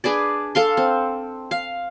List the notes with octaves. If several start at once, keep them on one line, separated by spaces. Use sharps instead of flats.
D4 G#4 B4 D5
A4 F5 C6
C4
F5